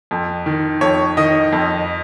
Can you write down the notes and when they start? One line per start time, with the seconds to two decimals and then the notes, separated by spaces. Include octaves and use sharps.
0.11 F2
0.46 D#3
0.81 F2 C#5
1.17 D#3 D#5
1.52 F2